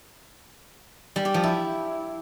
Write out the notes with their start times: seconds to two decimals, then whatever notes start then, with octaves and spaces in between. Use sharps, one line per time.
1.16 G3
1.25 G4
1.34 F3
1.44 E4